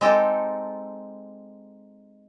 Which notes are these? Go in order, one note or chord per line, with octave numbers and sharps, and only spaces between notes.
G#3 C4 D#4 G4 A4